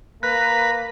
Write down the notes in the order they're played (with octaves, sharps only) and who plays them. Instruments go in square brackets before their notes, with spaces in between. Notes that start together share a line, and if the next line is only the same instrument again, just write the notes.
[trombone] A#3 [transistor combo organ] B4 [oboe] A#5 [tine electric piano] F#6